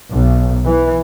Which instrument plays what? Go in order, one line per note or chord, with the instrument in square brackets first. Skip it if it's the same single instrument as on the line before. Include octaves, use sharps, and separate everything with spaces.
[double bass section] B1
E3